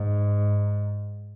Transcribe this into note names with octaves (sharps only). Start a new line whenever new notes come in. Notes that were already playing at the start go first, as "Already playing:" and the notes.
Already playing: G#2